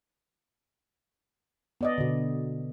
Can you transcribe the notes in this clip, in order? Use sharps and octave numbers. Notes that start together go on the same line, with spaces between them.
B3 D5 D#5
B2 D3